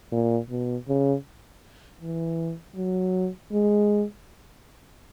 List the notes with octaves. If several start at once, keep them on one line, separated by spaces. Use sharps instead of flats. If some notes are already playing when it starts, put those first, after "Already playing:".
A#2
B2
C#3
E3
F#3
G#3